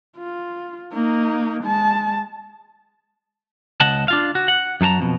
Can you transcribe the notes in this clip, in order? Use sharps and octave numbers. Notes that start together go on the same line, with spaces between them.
F4
A#3 D#4
G#3 A5
C#2 C#3 D#5 F#5 A5
D4 F4 F5
F#4
F#5
F#2 F#3 A4 A5 A#5
F2 B2